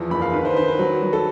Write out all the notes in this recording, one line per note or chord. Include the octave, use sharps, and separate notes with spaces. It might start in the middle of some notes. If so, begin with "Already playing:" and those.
Already playing: E2 F3
F#1 B5
F5
D#3 B4
C5
B4
D#3 C5
B4
F#3
F#3
A4